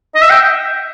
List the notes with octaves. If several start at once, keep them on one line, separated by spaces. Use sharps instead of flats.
D#5
E5
G5